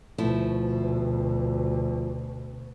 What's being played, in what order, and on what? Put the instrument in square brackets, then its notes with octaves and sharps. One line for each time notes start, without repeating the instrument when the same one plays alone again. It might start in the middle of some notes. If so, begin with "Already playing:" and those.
[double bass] D2 B2 [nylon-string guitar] F3 A3 E4